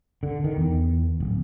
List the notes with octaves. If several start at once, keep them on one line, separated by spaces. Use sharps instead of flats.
D3
D#3
E2
D1